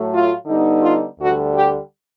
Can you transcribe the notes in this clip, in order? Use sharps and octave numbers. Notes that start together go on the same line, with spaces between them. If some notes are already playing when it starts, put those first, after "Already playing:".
Already playing: A2 F#3 A3
F4
D3 G3 B3 D#4
F4
D2 D3 G3 F#4
G4